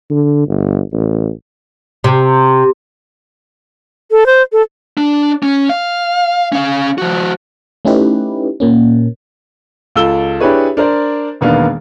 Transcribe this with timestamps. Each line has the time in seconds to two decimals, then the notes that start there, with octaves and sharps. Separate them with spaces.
0.10 D3
0.48 G1
0.92 A1
2.04 C3
4.11 A4
4.26 C5
4.52 A4
4.98 D4
5.43 C#4
5.69 F5
6.52 C#4 F5
6.98 F3 F#4
7.85 A3 C#4 D#4 E4 G4 B4
8.60 A#2 A#3 C#4
9.96 C#2 A4 E6 G7
10.40 D4 E4 G4 G#4 B4 C#5
10.77 D4 A#4 C5 D5
11.41 E1 D#3 A#3 B3 D4 F5